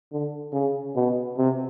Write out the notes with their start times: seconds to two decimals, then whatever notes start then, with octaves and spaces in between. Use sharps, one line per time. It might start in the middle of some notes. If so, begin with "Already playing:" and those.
0.12 D3
0.53 C#3
0.96 B2
1.37 C3